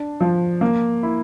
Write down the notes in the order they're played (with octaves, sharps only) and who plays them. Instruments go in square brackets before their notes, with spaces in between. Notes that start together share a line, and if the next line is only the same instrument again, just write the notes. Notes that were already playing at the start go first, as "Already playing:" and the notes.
Already playing: [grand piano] D4
F3
A#3
E4